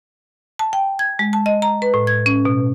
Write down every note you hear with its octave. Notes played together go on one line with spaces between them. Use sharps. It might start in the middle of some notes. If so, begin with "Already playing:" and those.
A5
G5
G#6
G#3
A5
D#5
A#5
B4
A2
G#6
C#4
B2